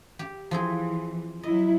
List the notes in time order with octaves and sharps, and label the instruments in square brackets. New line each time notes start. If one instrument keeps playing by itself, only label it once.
[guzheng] G4
[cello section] E3 [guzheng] F3 C4 G#4
[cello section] F#3 E4 [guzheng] D#5